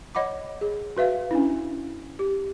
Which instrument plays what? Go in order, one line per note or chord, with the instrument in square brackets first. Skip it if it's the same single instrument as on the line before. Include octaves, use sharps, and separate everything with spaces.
[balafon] C#5 D#5 F#5 B5 D6
G#4
F#4 B4 E5 F5
C#4 D4 E4
G4